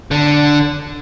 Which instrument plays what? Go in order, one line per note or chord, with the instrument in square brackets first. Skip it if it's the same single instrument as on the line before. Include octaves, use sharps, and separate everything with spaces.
[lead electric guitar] D3